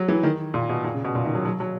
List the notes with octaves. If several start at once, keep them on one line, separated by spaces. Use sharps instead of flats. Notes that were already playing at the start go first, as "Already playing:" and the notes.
Already playing: F#3
E3
D#3
A#2
B2
A#2
C#3
B2
A#2
D#3
F#3
F#3
F#3